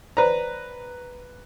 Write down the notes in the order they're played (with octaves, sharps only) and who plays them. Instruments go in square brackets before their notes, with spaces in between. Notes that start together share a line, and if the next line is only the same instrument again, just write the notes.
[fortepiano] B4 A#5 [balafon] C5 D5